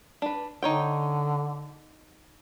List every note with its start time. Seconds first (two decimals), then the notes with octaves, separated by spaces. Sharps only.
0.22 D4 B4
0.63 D3 D#4 C#5 G5